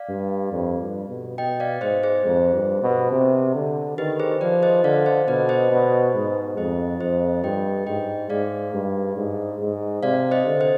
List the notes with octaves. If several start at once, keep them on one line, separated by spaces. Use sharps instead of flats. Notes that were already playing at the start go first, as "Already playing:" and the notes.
Already playing: D5 F5
G2
F2
G2
B2
B2 D#5 G5
D5 F5
G#2 C5 D#5
G#4 C5
F2
G2
B2
C3
D3
D#3 G4 B4
G#4 C5
F3 B4 D5
C5 D#5
D3 D5 F5
C5 D#5
B2 B4 D5
C5 D#5
B2
G#2
F2 C5 D#5
F2 C5 D#5
G2 D#5 G5
G#2 D#5 G5
G#2 D5 F5
G2
G#2
G#2
C3 D5 F5
C5 D#5
D3
C5 D#5